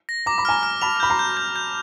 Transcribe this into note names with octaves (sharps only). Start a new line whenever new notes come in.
A#6
A#5 D6
B5
G#5 A#5 F6
F6
A5 B5 F7
B5 G6
A#5 C6
G6
G6
G6